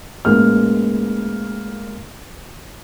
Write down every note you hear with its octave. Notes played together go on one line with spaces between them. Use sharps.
A1 G#3 A#3 F6